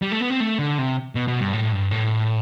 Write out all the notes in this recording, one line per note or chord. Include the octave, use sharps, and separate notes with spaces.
G3
A3
B3
C4
A3
D3
C3
B2
B2
G2
A2
G2
A2